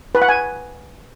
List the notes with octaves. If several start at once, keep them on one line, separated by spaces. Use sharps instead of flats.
B4
F#5
G#5